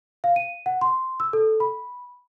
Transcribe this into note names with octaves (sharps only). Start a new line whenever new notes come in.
F5
D#7
F#5
C6
E6
A4
B5